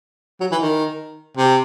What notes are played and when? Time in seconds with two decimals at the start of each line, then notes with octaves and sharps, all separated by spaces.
0.41 F#3
0.52 E3
0.62 D#3
1.37 C3